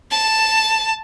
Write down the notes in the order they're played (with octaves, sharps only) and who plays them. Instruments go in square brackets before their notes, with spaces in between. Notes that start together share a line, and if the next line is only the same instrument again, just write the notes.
[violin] A5